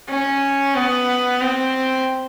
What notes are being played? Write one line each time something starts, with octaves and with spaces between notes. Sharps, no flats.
C#4
B3
C4